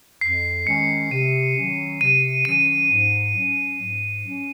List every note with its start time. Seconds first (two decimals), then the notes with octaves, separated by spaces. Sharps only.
0.21 F2 C7
0.66 D#3 G#3 C#4 C#7
1.11 C3 D#7
1.57 D#3 F#3 C#4
2.01 C3 D#7
2.45 D#3 F#3 C#4 D#7
2.91 G#2
3.35 F#3 C#4
3.81 G#2
4.24 F#3 C#4